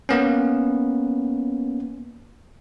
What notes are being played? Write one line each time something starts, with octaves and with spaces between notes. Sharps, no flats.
A#3 B3 C#4